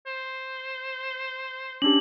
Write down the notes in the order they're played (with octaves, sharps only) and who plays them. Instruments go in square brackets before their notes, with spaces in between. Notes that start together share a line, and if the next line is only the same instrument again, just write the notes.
[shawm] C5
[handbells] C#4 D4 G4 [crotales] F#7